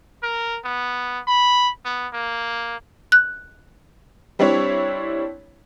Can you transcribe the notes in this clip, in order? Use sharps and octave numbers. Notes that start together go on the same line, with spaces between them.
A#4
B3
B5
B3
A#3
F#6
G3 C4 D4 E4 C#5